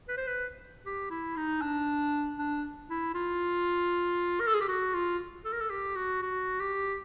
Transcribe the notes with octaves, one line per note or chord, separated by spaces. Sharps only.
B4
C5
B4
G4
E4
D#4
D4
D4
E4
F4
A#4
A4
G#4
G4
F#4
F4
A4
A#4
A4
G4
F#4
F#4
G4